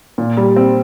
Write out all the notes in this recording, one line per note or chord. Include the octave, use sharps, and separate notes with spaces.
A#2
G3
C4